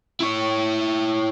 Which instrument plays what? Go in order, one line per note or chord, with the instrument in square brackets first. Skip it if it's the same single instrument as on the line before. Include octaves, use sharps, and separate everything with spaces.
[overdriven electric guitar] E4 C#5